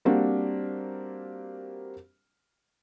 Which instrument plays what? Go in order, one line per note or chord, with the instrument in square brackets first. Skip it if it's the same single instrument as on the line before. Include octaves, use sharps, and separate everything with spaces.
[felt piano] G3 A#3 C4 D4 F#4